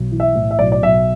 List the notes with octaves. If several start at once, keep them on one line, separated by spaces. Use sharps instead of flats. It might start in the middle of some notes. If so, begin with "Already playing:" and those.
Already playing: B1
E3
E5
A2
E5
B1 D5
D5
B1 E5